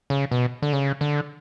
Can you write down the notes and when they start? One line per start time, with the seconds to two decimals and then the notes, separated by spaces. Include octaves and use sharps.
0.10 C#3
0.31 B2
0.62 D3
0.73 C#3
1.01 D3